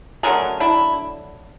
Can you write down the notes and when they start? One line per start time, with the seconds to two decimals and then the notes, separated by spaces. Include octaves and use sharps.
0.23 D3 F#3 A3 C#4 G#4 A#4
0.60 D4 E4